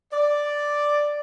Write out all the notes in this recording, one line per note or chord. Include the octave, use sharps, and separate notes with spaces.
D5